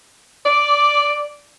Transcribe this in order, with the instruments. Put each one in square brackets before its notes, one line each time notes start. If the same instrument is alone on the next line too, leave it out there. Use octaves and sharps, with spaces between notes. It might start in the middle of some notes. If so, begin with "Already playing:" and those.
[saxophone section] D5